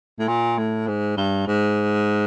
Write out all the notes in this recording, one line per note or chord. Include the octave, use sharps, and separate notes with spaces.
A2
A#2
A2
G#2
G2
G#2